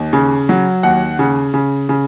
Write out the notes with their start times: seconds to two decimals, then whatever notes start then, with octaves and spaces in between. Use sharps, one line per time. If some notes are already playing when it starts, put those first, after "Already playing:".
Already playing: D#2
0.13 C#3
0.49 F#3
0.83 D#2 F#5
1.19 C#3
1.54 C#3
1.89 C#3